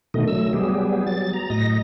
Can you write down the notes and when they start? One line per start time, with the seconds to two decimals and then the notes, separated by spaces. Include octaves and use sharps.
0.14 B2 D3 D#3 A3 D#5
0.28 F#3 A3 E6
0.53 F#3 G3 B3 G4 G#4
1.07 F#3 A6
1.33 A#5
1.50 A2 D#5 A#6